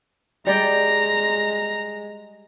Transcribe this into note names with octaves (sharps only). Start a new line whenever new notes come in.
G3 G#3 D5 G5 A#5